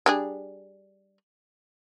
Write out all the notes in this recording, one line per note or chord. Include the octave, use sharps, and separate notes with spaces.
G3 D4 G#4